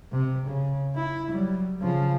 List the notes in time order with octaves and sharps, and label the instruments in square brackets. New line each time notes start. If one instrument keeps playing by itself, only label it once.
[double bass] C3
C#3
E4
F#3 G3
C#3 F3